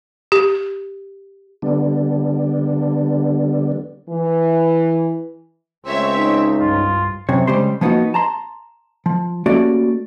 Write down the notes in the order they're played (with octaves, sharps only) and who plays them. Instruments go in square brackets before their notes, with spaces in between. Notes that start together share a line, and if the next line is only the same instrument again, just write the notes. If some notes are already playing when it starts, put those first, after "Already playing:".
[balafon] G4
[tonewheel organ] D3 G3 B3 D4
[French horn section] E3
[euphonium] C#2 [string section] A3 C#5 E5 [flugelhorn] C4
[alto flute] D#4
[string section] C2 G2 [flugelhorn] F4
[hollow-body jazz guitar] F#2 C3 C4 C#5
C#3 G3 G#3 G4 C5 C6
F3 A#3 B3 D4 D#4 F#4
A5 A#5 C6
F3
A3 A#3 C#4 F#4 G4 D5